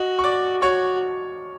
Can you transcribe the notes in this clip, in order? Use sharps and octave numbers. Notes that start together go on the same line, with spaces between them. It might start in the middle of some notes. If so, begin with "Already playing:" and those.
Already playing: F#4 D#5
C#6
D5 D6
F#4 C#5 C#6